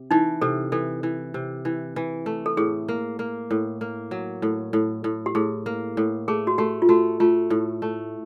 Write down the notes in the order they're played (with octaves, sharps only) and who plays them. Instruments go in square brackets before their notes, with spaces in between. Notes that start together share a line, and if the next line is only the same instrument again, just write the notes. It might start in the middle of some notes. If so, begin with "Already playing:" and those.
Already playing: [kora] C3
[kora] E3 [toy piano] D#4
[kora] C3 [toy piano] A4
[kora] E3 [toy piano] A4
[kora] E3
C3
E3
E3
A3
[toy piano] A4
[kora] A2 [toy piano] G#4
[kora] A#3
A#3
A2
A#3
F#3
A2
A2
A2
[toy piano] G4
[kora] A2 [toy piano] G#4
[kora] A#3
A2
[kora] A3 [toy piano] G#4
[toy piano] F#4
[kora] A3 [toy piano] G4
[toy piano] F4
[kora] A3 [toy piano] F#4
[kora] A3 [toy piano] F4
[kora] A2
A3